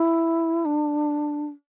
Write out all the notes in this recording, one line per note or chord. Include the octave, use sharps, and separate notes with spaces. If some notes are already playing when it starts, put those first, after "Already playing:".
Already playing: E4
D4